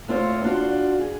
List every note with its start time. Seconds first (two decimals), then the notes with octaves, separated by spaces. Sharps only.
0.08 A2 C4 F4 C5 C#5
0.44 D4 F4 F#4
0.99 G#4